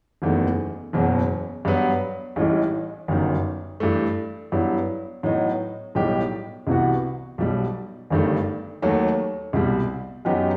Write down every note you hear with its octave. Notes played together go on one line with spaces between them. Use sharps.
F#1 E2 D#3 A3
F#1 E2 B2 F#3
G2 F#3 B3
A1 A2 E3 G3 D#4
G1 F#2 D#3
G2 E3 A3
G2 F#3 B3 E4
A2 F#3 B3 D#4
B1 A2 G3 D#4 G4
C2 C3 E3 B3 F#4
B1 B2 G3
G1 G2 D#3 A3
D#2 D#3 F#3 A3
C2 B2 G3
F#2 F#3 B3 D#4 G4